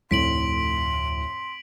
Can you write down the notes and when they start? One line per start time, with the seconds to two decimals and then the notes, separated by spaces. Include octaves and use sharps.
0.11 F1 D2 A2 C6 B6 D7 F#7